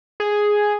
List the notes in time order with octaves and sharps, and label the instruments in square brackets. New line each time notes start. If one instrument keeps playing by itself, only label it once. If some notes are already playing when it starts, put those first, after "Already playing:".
[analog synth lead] G#4